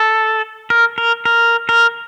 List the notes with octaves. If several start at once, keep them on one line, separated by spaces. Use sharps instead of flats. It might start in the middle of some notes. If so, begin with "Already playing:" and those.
Already playing: A4
A#4
A#4
A#4
A#4